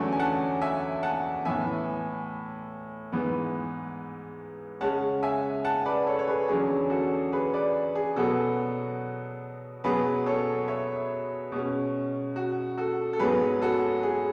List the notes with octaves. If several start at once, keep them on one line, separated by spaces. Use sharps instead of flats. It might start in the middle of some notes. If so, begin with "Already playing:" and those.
Already playing: E2 D3 F#3 A3 C#4 E5 G#5
G#5
F#5 A5
E5 G#5
F#5 A5
A2 E3 B3 E5 G#5
G#2 E3 B3
C#3 G#3 C#4 F#5 A5
E5 G#5
F#5 A5
B4 D5
A4 C#5
C#5
G#4 B4
E2 D3 F#3 C#4 G#4
F#4 A4
G#4 B4
B4 D5
G#4
B2 F#3 B3 F#4 A4
B2 F#3 B3 G#4 B4
A4 C#5
C#5 E5
B2 G#3 C#4
F#4
F#4 A4
A4
G#2 F#3 B3 G#4 B4
F#4 A4
G#4